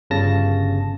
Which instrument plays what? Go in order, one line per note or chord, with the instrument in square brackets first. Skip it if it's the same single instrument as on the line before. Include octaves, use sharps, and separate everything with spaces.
[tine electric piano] G1 C#3 A5 A#6